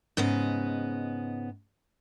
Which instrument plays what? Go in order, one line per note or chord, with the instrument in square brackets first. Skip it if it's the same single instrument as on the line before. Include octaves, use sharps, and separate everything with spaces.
[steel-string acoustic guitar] G#2 C#3 B3 D#5